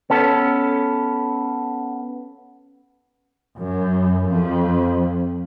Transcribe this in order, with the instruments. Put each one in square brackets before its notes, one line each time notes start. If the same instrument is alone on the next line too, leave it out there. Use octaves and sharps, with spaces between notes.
[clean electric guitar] B3 C#4 A4
[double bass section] F#2
F2